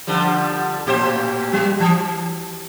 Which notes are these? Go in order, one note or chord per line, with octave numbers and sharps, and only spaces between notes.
D3 F3 G3
A2 G4 C5
F#3
E3